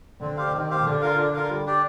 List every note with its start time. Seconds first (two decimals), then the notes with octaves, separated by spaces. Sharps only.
0.21 D3 C4
0.37 G4 C5 F5
0.53 D#3 C4
0.70 G4 C5 F5
0.85 D3 D4
1.01 F4 A#4 F5
1.17 D4
1.33 F4 A#4 F5
1.49 G3
1.66 D4 G4 D5